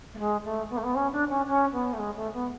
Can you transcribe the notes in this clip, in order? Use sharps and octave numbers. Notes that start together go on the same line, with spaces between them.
A3
G#3
A3
B3
A3
B3
C#4
D4
C#4
C#4
B3
A3
G#3
A3
B3